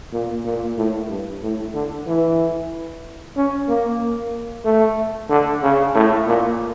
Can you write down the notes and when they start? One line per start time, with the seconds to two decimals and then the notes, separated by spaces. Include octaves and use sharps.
0.13 A#2
0.45 A#2
0.77 A2
1.09 G2
1.42 A2
1.74 D3
2.07 E3
3.36 C#4
3.68 A#3
4.65 A3
5.29 D3
5.63 C#3
5.95 A2
6.27 A#2